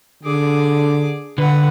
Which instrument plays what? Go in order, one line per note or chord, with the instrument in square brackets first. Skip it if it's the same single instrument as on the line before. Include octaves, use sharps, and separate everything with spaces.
[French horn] D3 [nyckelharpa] G#4 D6
[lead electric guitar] D3 [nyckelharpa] B4 F#5